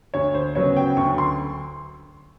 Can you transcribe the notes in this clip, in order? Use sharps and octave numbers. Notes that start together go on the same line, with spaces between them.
D2 C#5
C5
C#3 F#3 B3 C#5
G5
D2 C#6
C6